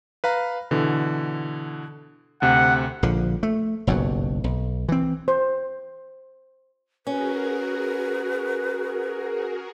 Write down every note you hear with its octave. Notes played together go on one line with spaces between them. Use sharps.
B4 F5 A#5
B2 D3 E3
D2 C3 F#5
A#1 D3 F3
A3
F#1 B1 G2 F#3
B1
E3 C4
C5
C#4 F#4 G#4 A#4 B4